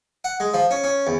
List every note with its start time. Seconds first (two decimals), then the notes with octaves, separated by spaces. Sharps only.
0.24 F#5
0.40 G#3
0.54 F3
0.71 C#4
0.84 C#4
1.07 E2